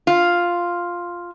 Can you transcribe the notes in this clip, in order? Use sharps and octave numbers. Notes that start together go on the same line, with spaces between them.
F4